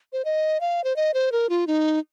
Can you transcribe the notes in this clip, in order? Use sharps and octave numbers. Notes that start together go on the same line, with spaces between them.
C5
D#5
F5
C5
D#5
C5
A#4
F4
D#4